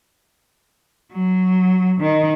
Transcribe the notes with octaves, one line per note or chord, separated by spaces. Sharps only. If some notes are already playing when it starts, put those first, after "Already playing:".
F#3
D#3